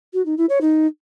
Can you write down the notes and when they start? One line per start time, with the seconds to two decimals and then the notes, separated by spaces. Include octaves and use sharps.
0.14 F#4
0.26 D#4
0.37 E4
0.49 C#5
0.61 D#4